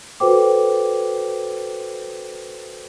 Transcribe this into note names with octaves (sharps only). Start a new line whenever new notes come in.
F#4 A4 B4 C5 G5 D6